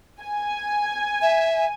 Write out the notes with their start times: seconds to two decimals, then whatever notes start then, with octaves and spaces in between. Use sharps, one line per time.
0.22 G#5
1.22 E5